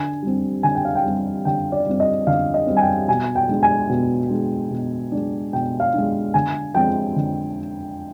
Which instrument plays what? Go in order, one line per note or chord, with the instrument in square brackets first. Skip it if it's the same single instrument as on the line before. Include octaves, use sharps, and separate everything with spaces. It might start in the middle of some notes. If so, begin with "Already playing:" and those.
Already playing: [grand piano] D3 G#5
G3 C4
D3 G#5
G5
F5
G5
G3 C4
D3 G5
D5
G3 C4
D#5
D3 F5
D#5
G3 C4
G#5
G5
B2 G#5
G5
G#3 D4
G#5
B2
G#3 D4
B2
G#3 D4
B2 G5
F5
G#3 D4
D3 G#5
F3 G#3 C4 G5
D3